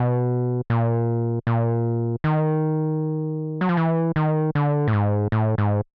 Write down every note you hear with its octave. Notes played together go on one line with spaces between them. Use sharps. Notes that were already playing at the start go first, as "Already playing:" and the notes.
Already playing: B2
A#2
A#2
D#3
F#3
F3
E3
D#3
D3
A2
G#2
A2
G#2